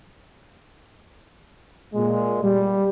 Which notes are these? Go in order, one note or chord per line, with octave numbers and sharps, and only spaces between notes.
A#2 G#3
G3